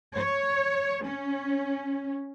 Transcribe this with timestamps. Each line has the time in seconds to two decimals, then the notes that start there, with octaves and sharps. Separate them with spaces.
0.16 C#5
1.04 C#4